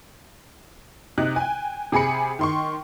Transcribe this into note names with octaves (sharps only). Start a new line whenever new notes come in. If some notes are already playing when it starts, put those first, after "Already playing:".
C3 D#4 F#6
G5 G#5
C3 G#4 G#5 B5 C#7
D#3 C6 C#6